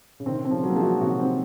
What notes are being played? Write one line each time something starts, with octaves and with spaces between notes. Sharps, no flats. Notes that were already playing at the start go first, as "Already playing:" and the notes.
C#3
C3 D#3 C4
C4
C#3 F3
F#3
A#3
F3 G#3
F#4
C3 D#3 F#4
C4